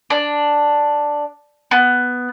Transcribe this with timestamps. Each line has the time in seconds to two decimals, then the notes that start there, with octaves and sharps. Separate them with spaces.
0.10 D4
1.71 B3